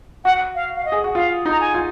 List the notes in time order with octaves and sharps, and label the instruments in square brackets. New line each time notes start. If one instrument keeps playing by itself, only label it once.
[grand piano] F#4 [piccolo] F#5
[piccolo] F5
F5
D#5
[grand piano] G#4
F#4
[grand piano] F4 [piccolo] F5
[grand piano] D#4 [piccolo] A#5
[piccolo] G#5
[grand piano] F4